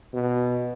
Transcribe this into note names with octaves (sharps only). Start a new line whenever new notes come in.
B2